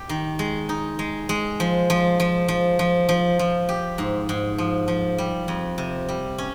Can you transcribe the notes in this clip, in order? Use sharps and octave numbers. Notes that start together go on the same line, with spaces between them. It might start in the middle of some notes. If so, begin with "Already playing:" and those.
Already playing: G4
D#3
G#3
D#4
G#3
G#3
F3
F3
F3
F3
F3
F3
F3
G4
G#2
G#2
F3
F3
G3
F2
C3
G3
C#4